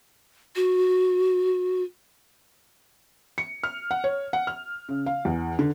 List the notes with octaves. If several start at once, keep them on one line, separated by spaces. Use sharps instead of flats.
F#4
C#7
F6
F#5
C#5
F#5
F6
C#3
F5
E2
D3